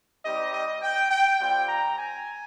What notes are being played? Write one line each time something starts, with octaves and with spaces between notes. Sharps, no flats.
G3 C4 D#4 G4 D#5
D#5
G5
G5
G3 C4 F4 G5
A#5
G#5